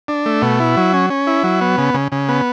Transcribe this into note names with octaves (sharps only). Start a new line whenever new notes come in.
D4
A3
B2
E4
F#3
C#4
C#4
E4
F#3
B3
C#3
C#3
C#3
B3